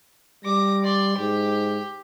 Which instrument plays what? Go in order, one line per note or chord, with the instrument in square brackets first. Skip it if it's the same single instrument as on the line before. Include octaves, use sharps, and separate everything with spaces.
[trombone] G3 [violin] D6 A#6
[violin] D5 C6
[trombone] G#2 [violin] G4